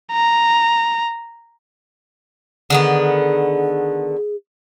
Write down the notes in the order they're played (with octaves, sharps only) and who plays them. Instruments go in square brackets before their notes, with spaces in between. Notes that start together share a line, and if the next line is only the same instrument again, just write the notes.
[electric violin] A#5
[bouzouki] D3 D#3 B3 [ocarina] G#4